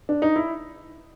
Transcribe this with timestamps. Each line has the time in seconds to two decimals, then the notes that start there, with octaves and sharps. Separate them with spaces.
0.09 D4
0.22 D#4
0.36 E4